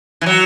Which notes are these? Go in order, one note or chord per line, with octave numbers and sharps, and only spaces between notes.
E3
F#3